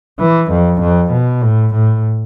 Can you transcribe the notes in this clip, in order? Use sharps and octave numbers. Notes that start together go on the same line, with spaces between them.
E3
F2
F2
B2
A2
A2